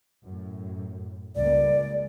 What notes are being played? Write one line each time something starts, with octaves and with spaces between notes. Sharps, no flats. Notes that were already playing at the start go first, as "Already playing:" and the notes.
F#2 A2
C#2 G3 A#3 D5
G#3